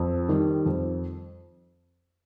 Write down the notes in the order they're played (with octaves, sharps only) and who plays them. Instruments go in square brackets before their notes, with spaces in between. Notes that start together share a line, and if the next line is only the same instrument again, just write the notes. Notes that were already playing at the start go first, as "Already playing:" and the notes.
Already playing: [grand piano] F2
D#3 G3
F2